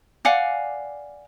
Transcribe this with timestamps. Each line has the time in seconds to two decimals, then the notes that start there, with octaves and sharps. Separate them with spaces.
0.25 D5 F5 F#5 G#5